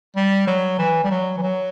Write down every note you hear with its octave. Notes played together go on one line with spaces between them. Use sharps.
G3
F#3
E3
G3
F#3
E3
F#3